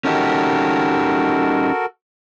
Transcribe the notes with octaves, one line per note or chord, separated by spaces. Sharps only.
C#4 D#4 F#4 G4 A4 A#4